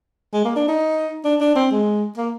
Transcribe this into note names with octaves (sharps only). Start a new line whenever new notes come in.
G#3
A#3
D4
D#4
D4
D4
C4
G#3
A#3